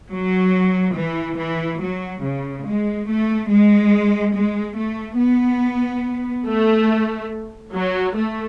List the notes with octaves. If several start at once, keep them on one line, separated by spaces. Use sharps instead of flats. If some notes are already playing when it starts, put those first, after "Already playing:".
F#3
E3
E3
F#3
C#3
G#3
A3
G#3
G#3
A3
B3
A3
F#3
A3